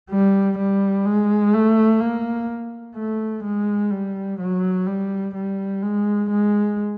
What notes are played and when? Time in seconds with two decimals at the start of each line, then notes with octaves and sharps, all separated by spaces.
0.10 G3
0.58 G3
1.06 G#3
1.54 A3
2.01 A#3
2.96 A3
3.44 G#3
3.91 G3
4.40 F#3
4.87 G3
5.35 G3
5.82 G#3
6.30 G#3